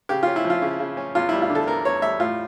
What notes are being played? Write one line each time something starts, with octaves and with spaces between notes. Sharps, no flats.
C#3 G4
F4
C#4
E4
F3
F4
C#3
C#3
C#4
E2 F4
G3 E4
F4
D3
A4
E2 A#4
E2 C#5
G3 E5
A2 F4